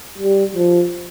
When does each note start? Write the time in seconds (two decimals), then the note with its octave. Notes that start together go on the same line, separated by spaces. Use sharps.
0.18 G3
0.55 F3